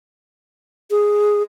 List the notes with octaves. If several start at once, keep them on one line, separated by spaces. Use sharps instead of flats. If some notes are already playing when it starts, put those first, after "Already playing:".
G#4